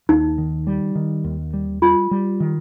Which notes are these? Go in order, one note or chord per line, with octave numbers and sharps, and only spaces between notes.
D#2 D#4
D#3
G3
D#3
D#2
G3
G3 F4
G3
D#3